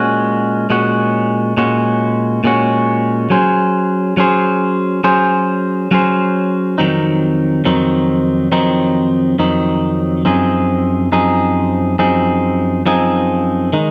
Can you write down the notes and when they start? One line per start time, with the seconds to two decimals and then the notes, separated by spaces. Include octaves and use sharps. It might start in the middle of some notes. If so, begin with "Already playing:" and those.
Already playing: A#2 G#3 C#4 F#4
0.70 A#2 G#3 C#4 F#4
1.57 A#2 G#3 C#4 F#4
2.44 A#2 G#3 C#4 F#4
3.30 F#3 C#4 G#4 C5
4.17 F#3 C#4 G#4 C5
5.04 F#3 C#4 G#4 C5
5.91 F#3 C#4 G#4 C5
6.78 F2 D#3 F#3 C4 D#4
7.65 F2 D#3 F#3 C4 D#4
8.52 F2 D#3 F#3 C4 D#4
9.39 F2 D#3 F#3 C4 D#4
10.25 F#2 F3 C4 D#4 G#4
11.12 F#2 F3 C4 D#4 G#4
11.99 F#2 F3 C4 D#4 G#4
12.86 F#2 F3 C4 D#4 G#4
13.73 D#3 G#3 D#4